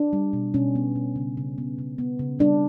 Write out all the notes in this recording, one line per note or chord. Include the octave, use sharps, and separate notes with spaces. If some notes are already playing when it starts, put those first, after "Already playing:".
Already playing: D4
G3
B2
B2 C#4
B3
B2
C#3
C#3
B3
C#3
B3
C#3
G3 D4